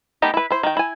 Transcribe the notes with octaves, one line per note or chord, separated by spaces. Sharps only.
A3 B3 D#4 G4 A#4
E4 B4
E4 C5
D#3 G5
E4 G#5